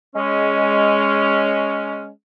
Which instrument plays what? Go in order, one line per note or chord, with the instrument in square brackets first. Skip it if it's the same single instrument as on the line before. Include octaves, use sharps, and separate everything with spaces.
[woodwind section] G#3 C#4